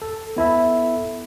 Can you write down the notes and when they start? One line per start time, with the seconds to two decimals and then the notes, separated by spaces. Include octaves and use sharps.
0.02 A4
0.36 B3 E4 A4 E5